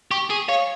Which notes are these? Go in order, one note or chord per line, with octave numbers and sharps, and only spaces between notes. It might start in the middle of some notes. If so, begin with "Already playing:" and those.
G4 C#6
G#4
C#5 F5